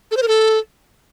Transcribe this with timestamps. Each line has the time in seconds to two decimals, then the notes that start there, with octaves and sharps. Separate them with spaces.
0.11 A4
0.17 C5
0.22 A#4
0.28 A4